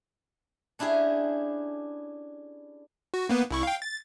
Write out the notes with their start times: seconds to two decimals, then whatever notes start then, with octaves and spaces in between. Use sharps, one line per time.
0.79 C#4 D4 E4 G4 G#4
3.14 F#4
3.29 A#3 B3 B4
3.51 C2 E4 C#6
3.63 F5 G5
3.82 A6